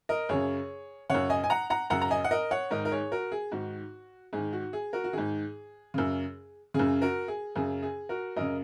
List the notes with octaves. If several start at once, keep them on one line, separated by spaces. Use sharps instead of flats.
A#4 D#5
F#2 C#3 G#4 C#5
F#2 C#3 C#5 F#5
D#5 G#5
G#5
F#5 A#5
F#5 A#5
F#2 C#3 F#5 A#5
A#5
D#5 G#5
F#5
A#4 D#5
C#5 F#5
G#2 D#3 A#4 D#5
A#4
G#4 C#5
F#4 A#4
G#4
G#2 D#3 F#4
G#2 D#3 G#4
F#4
G#4
F#4 A#4
F#4
G#2 D#3 G#4
F#2 C#3
F#2 C#3 G#4
F#4 A#4
G#4
F#2 C#3 G#4
G#4
F#4 A#4
F#2 C#3 A#4 D#5